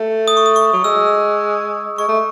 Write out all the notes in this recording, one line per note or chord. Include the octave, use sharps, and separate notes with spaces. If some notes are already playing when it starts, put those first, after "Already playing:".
Already playing: A3
D#6
C#6
D#6
C#6
F#3
G#3 E6
G#3 C#6
A3